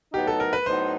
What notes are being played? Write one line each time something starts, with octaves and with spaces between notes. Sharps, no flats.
A2 F#3 B3 D#4 G4
A4
A#4
B4
A2 F#3 B3 D#4 C5